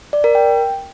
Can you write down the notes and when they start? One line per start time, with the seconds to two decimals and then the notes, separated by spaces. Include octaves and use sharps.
0.13 D5
0.24 A#4
0.35 G5